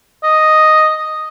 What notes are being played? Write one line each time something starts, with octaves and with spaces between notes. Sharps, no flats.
D#5